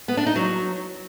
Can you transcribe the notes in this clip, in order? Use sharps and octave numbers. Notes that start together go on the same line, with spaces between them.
B3
D4
D#4
F#3